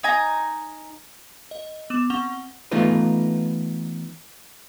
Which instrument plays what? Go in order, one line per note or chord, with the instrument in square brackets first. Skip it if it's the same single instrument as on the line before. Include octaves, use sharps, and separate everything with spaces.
[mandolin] D#4 G#5 A#5
[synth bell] D#5
B3 D6 E7
C4 F#5 C#6 F7 G7
[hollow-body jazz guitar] E3 A3 B3 D#4 F4 B4